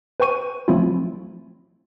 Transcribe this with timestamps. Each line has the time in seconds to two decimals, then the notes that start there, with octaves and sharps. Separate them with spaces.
0.20 B4 C5 G5 C#6 D#7
0.68 F3 F#3 A3 C4 E4 F4